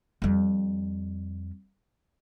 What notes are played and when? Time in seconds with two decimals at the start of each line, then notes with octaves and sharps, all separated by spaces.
0.22 F2 G3